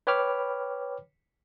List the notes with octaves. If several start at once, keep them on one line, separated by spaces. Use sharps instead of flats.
B4 C#5 G5 B5 D6 F6